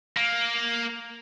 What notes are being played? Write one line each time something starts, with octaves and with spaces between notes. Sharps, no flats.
A#3